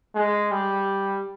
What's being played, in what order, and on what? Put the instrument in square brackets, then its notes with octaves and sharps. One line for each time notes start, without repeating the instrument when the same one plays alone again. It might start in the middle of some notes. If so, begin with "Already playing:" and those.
[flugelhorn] G#3
G3